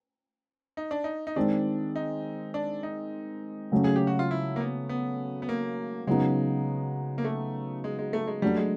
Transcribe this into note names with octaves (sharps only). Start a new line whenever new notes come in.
D#4
D4
D#4
D#4
D#3 G#3 C4 D4
D#4
D4
D#4
C#3 F#3 A3 C#4
G#4
G4
F#4
F4
E4
A#3
B3
B3
B3
A#3
C#3 F#3 G#3 B3 D#4
A#3
A3
G#3
G#3
A3
G#3
F#3 G3 A3 D4
G#3